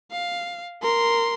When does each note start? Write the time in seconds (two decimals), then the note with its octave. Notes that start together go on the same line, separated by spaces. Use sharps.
0.12 F5
0.82 A#4 C6